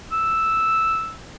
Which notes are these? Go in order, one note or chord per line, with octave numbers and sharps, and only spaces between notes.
E6